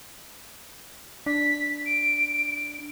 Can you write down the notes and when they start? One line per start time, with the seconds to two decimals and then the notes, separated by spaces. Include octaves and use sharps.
1.26 D4 B6
1.86 D7